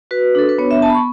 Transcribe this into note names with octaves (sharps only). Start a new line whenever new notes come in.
F#4 B4
D4 A4
B4
B3 C#5
E5
B3 A5
B5
C#6